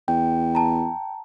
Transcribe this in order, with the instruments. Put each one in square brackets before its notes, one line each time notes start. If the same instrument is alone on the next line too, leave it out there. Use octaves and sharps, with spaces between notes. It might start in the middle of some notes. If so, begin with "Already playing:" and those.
[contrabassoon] E2 [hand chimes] G5
[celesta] A5 A#5